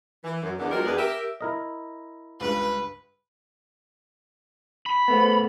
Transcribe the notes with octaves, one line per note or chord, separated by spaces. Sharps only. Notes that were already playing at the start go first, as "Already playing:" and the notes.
E3
F#2
E2 D3
F3 F#3 G#3 G4 A#4
E2 B3 D4 F#4 G#4 B4
G4 A#4 E5
E4 A#4 D#5
C#2 G2 B4
B5
A3 B3 B4 C5